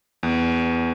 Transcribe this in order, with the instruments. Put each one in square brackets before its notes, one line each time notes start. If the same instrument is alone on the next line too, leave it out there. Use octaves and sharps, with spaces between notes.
[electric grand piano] E2